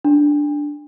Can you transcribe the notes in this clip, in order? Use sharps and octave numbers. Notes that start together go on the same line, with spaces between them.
D4